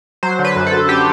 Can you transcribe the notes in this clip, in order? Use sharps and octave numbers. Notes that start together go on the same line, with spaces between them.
F#3 C5
D3
B4
F#2
A4
F#2
G4